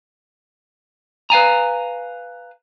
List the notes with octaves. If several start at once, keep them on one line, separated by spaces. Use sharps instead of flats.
B4 F5 G#5 A#5